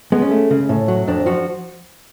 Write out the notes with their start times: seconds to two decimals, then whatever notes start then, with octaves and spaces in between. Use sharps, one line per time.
0.12 G#3 B3
0.22 C#4
0.31 A3
0.51 C#3
0.69 A2
0.88 F#3
1.07 F2 D4
1.26 F3 F#4